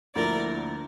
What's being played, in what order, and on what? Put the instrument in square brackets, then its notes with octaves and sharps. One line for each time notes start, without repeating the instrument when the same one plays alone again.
[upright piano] D2 D3 F3 A#3 E4 [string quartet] A#4 D5